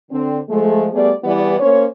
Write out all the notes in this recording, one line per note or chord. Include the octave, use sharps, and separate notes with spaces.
D3 C4
F3 G#3 A3
G3 A3 B3 G#4 D5
E2 E3 G3 B3 G4 D5
A#3 C#4 C5 C#5